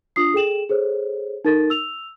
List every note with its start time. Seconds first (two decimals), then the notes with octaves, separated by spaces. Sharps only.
0.16 D4 F4 D#6 C7
0.34 G#4 A4 G5 E7 F#7
0.69 G#4 A4 C5 C#5
1.45 D#4 A4 A#4 A6
1.70 E6 F7